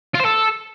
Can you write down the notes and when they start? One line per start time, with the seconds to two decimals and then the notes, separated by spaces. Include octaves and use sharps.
0.15 F4
0.20 C5
0.25 A4